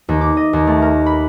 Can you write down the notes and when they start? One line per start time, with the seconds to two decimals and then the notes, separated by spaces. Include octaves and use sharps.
0.09 D#2
0.21 D6
0.37 D#5
0.53 D#2
0.67 A3
0.82 A#4
1.06 B5